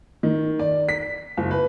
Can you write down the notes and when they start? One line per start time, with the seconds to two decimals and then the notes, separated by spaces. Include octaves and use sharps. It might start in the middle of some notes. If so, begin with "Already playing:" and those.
0.23 D#3
0.59 D5
0.89 B6
1.37 F#1
1.51 B4